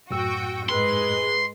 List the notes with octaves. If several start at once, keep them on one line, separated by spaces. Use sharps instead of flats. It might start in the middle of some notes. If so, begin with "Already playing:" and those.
F#2 A2 F#4 G5 E6
G#2 G#3 B4 C6